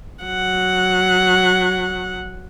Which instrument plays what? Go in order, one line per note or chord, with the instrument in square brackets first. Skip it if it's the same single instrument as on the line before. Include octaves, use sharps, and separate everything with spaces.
[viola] F#3 F#5